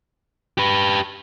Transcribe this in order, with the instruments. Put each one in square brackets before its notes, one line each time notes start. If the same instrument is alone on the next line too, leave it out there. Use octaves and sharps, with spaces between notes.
[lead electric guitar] G4 B4